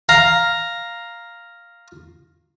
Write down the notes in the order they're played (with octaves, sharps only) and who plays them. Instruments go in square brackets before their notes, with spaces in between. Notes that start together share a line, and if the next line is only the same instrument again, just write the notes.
[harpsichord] F5 A#5